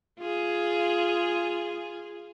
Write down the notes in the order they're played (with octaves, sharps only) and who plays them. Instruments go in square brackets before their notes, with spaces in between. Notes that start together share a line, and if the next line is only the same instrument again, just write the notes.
[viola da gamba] F4 G#4